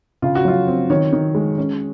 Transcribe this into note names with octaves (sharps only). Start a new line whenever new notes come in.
C#3 F4
F#4
F#3 F4
C4
D#3 C#5
D#3
G#3
C#4